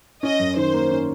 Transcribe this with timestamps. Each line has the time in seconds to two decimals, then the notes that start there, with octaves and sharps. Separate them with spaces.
0.23 C#4 D#5
0.40 F#2
0.56 D#3 C5
0.73 A#3
0.91 C#4